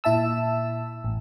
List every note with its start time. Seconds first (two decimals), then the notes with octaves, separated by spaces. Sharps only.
0.04 A#2 E4 E5 A5 E6
1.04 A1